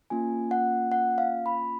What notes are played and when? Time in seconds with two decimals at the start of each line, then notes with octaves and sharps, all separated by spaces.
0.10 A#3 C#4 F4 G#5
0.51 F#5
0.92 F#5
1.18 F5
1.46 B5